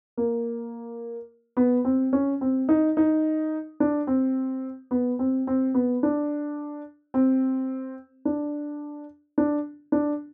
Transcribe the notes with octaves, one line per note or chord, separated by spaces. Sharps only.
A#3
B3
C4
C#4
C4
D#4
D#4
D4
C4
B3
C4
C4
B3
D4
C4
D4
D4
D4